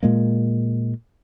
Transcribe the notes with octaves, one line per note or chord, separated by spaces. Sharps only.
A#2 G#3 A#3